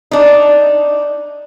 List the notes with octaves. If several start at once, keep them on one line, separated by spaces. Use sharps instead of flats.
D4 D#4